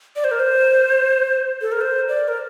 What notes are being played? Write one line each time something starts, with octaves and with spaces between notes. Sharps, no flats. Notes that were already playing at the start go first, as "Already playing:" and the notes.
D5
C5
A#4
C5
A4
A#4
C5
D5
A#4